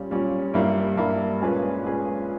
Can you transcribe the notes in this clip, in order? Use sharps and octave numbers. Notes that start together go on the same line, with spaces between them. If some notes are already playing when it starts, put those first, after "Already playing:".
Already playing: A#2 G3 C#4
A#2 G3 C#4
G2 G3 A#3 E4
G2 G3 A#3 E4
A#2 G#3 C#4 G#4 B4
A#2 G#3 C#4 G#4 B4